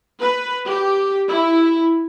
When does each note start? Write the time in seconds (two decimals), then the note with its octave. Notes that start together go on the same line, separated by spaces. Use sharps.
0.21 B4
0.67 G4
1.29 E4